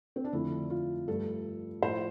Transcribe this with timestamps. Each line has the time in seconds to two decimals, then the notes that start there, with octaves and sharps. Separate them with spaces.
0.16 C4
0.24 D4
0.33 F2 D3 A3 E4
0.70 F4
1.07 G2 F3 A3 A4
1.82 A2 F3 A3 C5